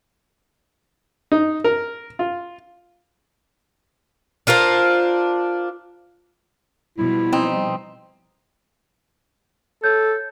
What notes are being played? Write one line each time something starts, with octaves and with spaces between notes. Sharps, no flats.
D#4
A#4
F4
D4 F4 A#4 C5
B2 F3 G3 E4
C4 D#4
A4 C#5 G6